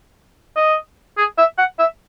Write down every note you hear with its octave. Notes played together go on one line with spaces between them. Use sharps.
D#5
G#4
E5
F#5
E5